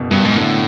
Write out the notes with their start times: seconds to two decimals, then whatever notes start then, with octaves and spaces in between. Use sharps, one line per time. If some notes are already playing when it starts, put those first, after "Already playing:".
Already playing: F#1 B2
0.11 G2 B2
0.25 G#2
0.36 A2 D3